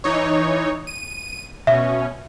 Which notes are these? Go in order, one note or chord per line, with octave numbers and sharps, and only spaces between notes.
E3 D#4 C#5
D#7
B2 C#4 E5